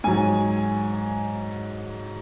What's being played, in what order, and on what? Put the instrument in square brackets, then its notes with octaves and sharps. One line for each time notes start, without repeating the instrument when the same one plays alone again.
[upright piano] G#2 F#3 G#5